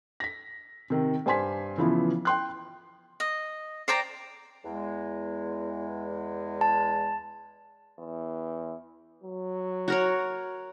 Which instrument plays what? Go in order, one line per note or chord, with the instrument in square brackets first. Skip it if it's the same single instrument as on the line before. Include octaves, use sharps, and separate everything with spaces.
[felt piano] A#6 B6
C3 D#3
G2 C5 G#5 C6 B6
C#3 E3 F3 B3 E4
G5 C6 F#6
[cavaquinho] D#5
C5 D5 G5 A#5
[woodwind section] E2 G#3
[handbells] A5
[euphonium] E2
F#3
[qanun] F#4 A#4 C#5